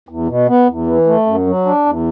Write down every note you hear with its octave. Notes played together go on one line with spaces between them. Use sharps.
E2
B2
B3
E2
E3
A3
F#2
F#3
D4
E2